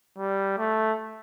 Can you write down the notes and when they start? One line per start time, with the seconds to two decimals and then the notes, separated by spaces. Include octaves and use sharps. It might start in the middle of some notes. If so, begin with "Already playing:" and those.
0.18 G3
0.58 A3